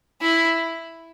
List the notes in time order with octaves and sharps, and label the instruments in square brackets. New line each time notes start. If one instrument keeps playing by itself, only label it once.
[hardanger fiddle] E4